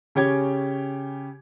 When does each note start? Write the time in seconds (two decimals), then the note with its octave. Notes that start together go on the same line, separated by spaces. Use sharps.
0.15 C#3 C#4 G4 G5 G#6